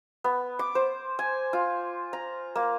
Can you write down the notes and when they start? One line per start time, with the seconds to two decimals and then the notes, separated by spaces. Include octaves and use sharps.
0.24 B3
0.59 D6
0.75 C5
1.19 G#5
1.53 F4
2.13 A#5
2.55 A#3